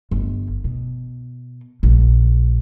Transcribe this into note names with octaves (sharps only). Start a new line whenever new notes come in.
G1
B2
A#1